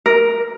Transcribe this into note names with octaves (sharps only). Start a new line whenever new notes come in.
A#4